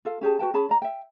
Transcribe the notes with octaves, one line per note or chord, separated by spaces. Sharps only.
F4 A4 F5
C#4 G4 G#4 A5
F#4 B4 G5 A5
C#4 G#4 A5 B5
D5 A#5
E5 G5